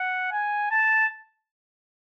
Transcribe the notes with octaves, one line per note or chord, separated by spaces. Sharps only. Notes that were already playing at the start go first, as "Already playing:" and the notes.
Already playing: F#5
G#5
A5